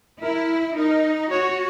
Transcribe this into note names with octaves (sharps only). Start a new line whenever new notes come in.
E4 A#4
D#4 A#4
F#4 C#5